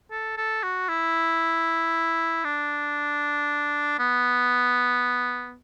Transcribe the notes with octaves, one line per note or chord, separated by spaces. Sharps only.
A4
A4
F#4
E4
D4
B3